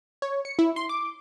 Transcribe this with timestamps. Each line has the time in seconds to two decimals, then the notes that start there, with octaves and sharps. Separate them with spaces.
0.22 C#5
0.45 C#7
0.59 E4
0.76 C6
0.89 D6